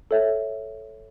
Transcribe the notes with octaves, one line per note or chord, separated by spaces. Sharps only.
A4 C#5 E5